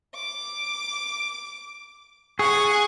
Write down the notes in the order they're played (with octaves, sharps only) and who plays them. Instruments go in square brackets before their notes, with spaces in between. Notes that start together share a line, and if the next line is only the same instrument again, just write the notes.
[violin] D6
[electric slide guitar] G#4 [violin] F#5 G#5 [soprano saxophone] C#6